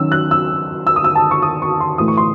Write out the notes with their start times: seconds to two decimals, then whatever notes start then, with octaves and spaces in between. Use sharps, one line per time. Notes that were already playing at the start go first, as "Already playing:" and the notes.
Already playing: D#3 F#3 C#4 E6
0.12 F#6
0.31 E6
0.87 E6
0.96 D#6
1.04 E6
1.15 A5
1.31 C#6
1.42 D#6
1.62 C#6
1.80 C6
1.98 A2 E3 A3 D#6
2.08 C#6
2.17 C6